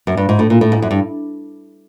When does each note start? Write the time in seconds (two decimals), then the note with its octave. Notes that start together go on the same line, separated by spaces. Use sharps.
0.07 F#2
0.17 G2
0.29 G#2
0.39 A2
0.50 A#2
0.61 A2
0.72 G#2
0.82 F#2
0.91 G2